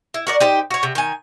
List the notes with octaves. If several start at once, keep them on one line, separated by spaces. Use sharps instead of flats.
E4
F#4 A#4 D5
D#4 G4 C5
F#4 C#5
C3
D#3 G#5